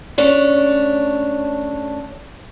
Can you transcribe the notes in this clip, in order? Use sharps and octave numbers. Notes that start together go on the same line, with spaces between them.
A3 C#4 D4